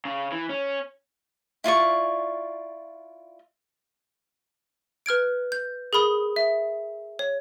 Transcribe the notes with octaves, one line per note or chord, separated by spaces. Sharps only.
C#3
E3
C#4
E4 F4 D5 C#6
B4 F6 G#6 D7
G6
G#4 A#4 B5 D#6
E5
C#5